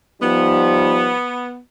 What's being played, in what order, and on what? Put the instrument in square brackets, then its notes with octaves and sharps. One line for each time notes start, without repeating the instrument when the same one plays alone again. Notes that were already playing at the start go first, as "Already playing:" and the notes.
[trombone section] F3 G3 D#4 [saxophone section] B3